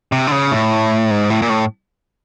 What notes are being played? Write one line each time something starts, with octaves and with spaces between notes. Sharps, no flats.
C3
D3
C#3
A2
G#2
A2
A#2
A2